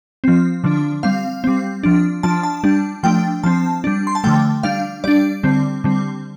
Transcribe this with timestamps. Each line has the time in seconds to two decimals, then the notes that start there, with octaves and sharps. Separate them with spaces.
0.24 F3 C4
0.64 D3 F3 D4
1.03 G3 C4 F5
1.44 G3 C4
1.83 F3 D4
2.23 F3 D4 A5
2.43 A5
2.64 G3 D4
3.03 F3 A3 D4 G5
3.43 F3 C4 A5
3.84 G3 D4
4.07 C6
4.15 A5
4.24 D3 F3 A3 G5
4.63 G3 D4 F5
5.04 G3 D4 D5
5.43 D3 G3 C4
5.84 D3 G3 C4